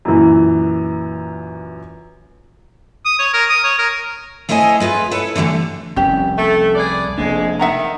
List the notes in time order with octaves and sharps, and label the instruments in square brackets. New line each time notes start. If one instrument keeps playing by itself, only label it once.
[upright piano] F#2 A#2 E3
[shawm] D#6
C#5
A#4
D#6
C#5
A#4
[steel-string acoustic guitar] A3 E4 C5 C#5 D#5 G#5
G#3 F4 B4 G#5
E4 A4 B4 C#5
D3 E3 G3 A3
[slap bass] F1 C2 [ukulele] C#4 G4
[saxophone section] A3
G#4 B4 D5
[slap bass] F1 A#3 D4 [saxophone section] F2 G#3
[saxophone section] D#3 [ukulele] E5 F#5 A#5